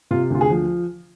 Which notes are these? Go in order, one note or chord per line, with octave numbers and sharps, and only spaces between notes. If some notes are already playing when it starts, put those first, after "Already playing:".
C3 F4
D2 F4
G#4
F3